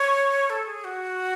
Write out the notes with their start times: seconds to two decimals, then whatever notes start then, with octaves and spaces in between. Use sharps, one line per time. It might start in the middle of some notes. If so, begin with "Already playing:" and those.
Already playing: C#5
0.50 A4
0.67 G#4
0.84 F#4